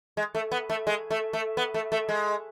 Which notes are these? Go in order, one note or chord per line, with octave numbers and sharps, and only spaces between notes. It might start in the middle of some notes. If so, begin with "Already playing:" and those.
G#3
A3
B3
A3
G#3
A3
A3
B3
A3
A3
G#3